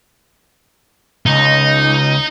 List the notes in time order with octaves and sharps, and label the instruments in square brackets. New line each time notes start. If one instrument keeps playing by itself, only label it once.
[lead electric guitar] C#2 [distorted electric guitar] D#4